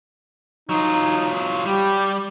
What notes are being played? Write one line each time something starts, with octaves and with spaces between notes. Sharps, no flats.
F#3 D#4 F4
G3 G4